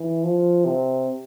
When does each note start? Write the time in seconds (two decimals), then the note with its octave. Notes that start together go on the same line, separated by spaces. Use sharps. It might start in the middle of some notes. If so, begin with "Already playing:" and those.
Already playing: E3
0.24 F3
0.65 C3